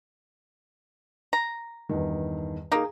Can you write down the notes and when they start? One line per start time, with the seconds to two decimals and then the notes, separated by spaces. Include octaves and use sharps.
1.33 A#5
1.89 E2 G2 D#3
2.72 A#3 D#4 G#4 A#5